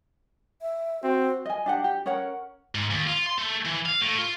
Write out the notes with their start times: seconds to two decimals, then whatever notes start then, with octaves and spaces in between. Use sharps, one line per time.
0.62 E5
1.03 C4 F#4
1.46 D#5 G#5
1.66 D4 G4 F#5
1.84 G4
2.06 C#4 A#4 C#5 F#5
2.75 G#2
2.91 D#2
3.07 F4
3.26 C6
3.38 A3
3.65 E3
3.86 F5
4.02 A2
4.19 F4